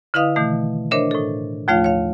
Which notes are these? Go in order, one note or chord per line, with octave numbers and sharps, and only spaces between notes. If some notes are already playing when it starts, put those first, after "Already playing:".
D3 E4 B4 D#5 F5 D#6
B2 D#3 E3 A3
D4 A#4 C5 C#5 D#5 E5
A2 A4
D#2 F3 A3 F4 C#5 F5
C#5 F5